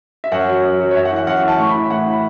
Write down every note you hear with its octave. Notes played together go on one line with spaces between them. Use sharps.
E5
F#2 F#5
F#3
F#2
F#3
C#5
F#2 E5
F#5
E3
F#5
F#2 F#5
F#5
E3
A5
A2 C#6
B5
E3
E5
A2 F#5
E3 B5